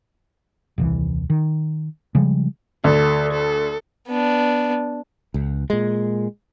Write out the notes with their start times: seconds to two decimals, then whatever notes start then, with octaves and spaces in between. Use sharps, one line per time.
0.78 D#1 C2 E3
1.30 D#3
2.15 C#3 F3 G3 G#3
2.84 D2 A4
3.32 A4
4.08 B3 D4
5.34 C#2
5.70 A#2 G#3